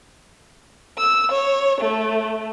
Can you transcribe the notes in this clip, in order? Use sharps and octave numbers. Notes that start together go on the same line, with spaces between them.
E6
C#5
A3